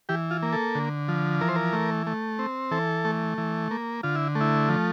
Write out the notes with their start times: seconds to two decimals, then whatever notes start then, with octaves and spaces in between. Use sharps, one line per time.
0.09 E3 G4
0.31 F4
0.43 A#3
0.53 A4
0.75 D3
1.08 F3
1.41 E3 A#4
1.48 C5
1.56 A#4
1.73 A3
2.07 A3
2.39 C4
2.71 E3 A4
3.05 A3
3.38 E3
3.71 A#3
4.03 D3 F4
4.15 E4
4.35 A3
4.41 E4
4.69 F3